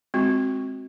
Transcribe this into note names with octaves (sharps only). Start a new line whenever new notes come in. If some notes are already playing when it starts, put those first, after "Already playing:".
G#3 C4 F4 F#4